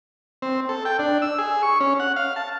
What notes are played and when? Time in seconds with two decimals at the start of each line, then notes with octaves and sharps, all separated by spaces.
0.42 C4
0.69 A4
0.85 G5
0.99 D4
1.22 E6
1.38 G#4
1.63 C#6
1.80 C#4
2.00 F#5
2.16 F5
2.36 A5